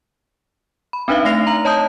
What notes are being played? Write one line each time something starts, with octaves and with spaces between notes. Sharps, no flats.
B5
C4 D4 D#4 B4 E5 F5
A3 A#6 C7 F7
A#5 F#7
C#5 D#5 A5 A#5 D#6 G6